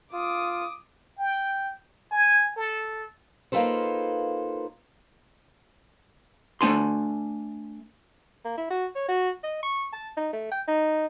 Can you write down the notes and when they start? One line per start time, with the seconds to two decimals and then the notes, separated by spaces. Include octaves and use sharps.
0.13 F4 D6 D#6
1.18 G5
2.11 G#5
2.56 A4
3.52 A#3 D#4 F4 A4 B4 C5
6.61 A3 D4 G#5 C6
8.45 A#3
8.57 E4
8.70 F#4
8.96 C#5
9.08 F#4
9.43 D#5
9.63 C#6
9.93 A5
10.17 D#4
10.33 A3
10.52 G5
10.68 D#4